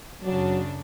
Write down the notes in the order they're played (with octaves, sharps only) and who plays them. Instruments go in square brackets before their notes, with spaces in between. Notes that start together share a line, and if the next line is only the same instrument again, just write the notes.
[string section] F#2 C#3 D4 [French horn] F#3